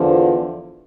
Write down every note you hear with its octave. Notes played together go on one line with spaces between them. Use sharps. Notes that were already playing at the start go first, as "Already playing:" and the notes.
Already playing: E2 D3 F3